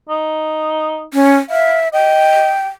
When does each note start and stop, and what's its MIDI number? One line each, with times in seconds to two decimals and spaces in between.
0.09 1.04 63
1.14 1.36 61
1.50 1.89 76
1.50 1.79 77
1.94 2.51 75
1.94 2.67 79